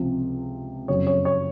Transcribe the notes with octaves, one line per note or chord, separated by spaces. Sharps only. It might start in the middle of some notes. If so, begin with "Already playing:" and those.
Already playing: C#2 C3 F3
F#1 F2 C#3 F#3 C#5
C#5
C#5